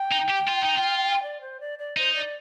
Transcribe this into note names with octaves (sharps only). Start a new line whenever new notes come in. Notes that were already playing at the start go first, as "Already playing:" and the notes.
Already playing: G5
D#4
G4
F4
D#4
F4
D5
C5
D5
D5
D#4 C5
D5